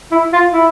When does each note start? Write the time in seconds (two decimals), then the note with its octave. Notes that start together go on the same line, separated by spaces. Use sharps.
0.12 E4
0.33 F4
0.53 E4